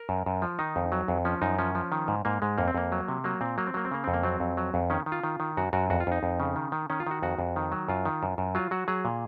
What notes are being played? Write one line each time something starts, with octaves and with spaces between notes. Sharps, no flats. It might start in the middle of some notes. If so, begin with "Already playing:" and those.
Already playing: A#4
F#2
F#2
F3
D#3 D#4
F2
F#3
F2
F3 C#4
F#2 D#4
F3 C#4
F3
D#3
G#2
G#2 A#3
G#2 G#3
F2 A#3
C4
F2 A#3
F#3
C3
F#3 A#3
A#2 C4
F#3 A#3
C4
F#3 A#3
C4
C#3 A#3
F2 C4
A#3
F#3 C4
F2
F#3
F2
D#3 C#4
D#3
F4
D#3
D#3
F#2 F#4
F#2 F#4
F2 F#4
F4
F2 D#4
F2
C#3
D#3
D#3
D#3 C#4
F4
D#3 F#4
F2 F#4
F2
D#3
F#3
F#2 F4
D#3
F#2
F#2
F#3 F4
F#3 F#4
F#3 G#4
A#2